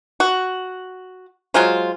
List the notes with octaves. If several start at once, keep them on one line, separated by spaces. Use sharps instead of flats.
F#4
F#3 G#3 F4 C5